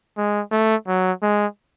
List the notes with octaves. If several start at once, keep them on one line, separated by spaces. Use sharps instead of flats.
G#3
A3
F#3
G#3